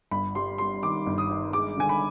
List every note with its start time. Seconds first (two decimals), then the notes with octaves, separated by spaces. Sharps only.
0.11 G1 B5
0.35 G3 C6
0.58 G3 C6
0.83 D#3 D6
1.06 G1
1.18 D#6
1.30 D#3
1.53 G#3 D6
1.77 D3 G#5
1.89 B5